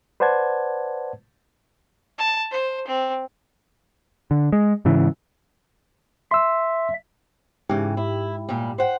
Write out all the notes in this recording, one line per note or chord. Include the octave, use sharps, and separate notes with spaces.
B4 C5 D5 F#5 A5 G#6
A5
C5
C4
D3
G#3
G#2 C#3 E3
E5 C6 E6
G#2 C#3 E3 G4
E4
A#2 G3
C5 F#5 G5